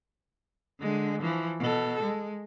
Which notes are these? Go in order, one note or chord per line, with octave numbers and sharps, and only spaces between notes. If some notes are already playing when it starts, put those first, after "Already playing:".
D3 G#3
E3 F3
B2 A4
G#3